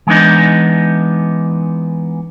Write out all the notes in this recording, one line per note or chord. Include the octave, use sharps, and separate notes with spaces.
E3 G#3 B3 D4 D#4